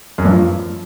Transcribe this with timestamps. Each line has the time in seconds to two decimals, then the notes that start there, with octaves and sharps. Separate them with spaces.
0.18 F#2
0.25 G2
0.32 F3